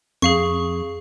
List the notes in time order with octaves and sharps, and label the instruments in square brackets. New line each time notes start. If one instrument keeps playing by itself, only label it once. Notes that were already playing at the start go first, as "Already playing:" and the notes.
[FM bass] F2 [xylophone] G#4 F5 C#6